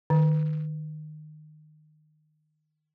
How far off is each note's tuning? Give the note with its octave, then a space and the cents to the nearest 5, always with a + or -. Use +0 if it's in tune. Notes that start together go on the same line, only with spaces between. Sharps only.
D#3 -25